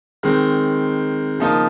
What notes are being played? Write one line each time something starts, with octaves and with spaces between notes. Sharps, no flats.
D#3 G#3 C4
C#3 F3 A#3 D#4